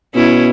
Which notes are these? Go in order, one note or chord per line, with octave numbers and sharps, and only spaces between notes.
B2 C#4 E4